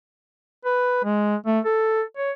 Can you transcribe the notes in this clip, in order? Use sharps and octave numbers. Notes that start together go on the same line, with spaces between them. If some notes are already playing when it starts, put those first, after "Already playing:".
B4
G#3
A3
A4
C#5